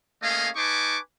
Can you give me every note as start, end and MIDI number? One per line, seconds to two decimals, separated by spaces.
0.23 0.49 57
0.23 0.49 58
0.23 0.49 61
0.23 0.49 68
0.23 0.49 75
0.23 0.49 77
0.56 0.97 63
0.56 0.97 71
0.56 0.97 80
0.56 0.97 81
0.56 0.97 85
0.56 0.97 86